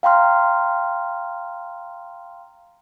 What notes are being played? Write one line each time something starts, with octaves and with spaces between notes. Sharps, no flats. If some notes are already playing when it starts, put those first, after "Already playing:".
F5 G5 A#5 C6 F6